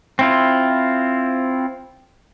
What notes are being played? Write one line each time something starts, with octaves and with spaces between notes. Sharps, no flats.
C4 E4 F4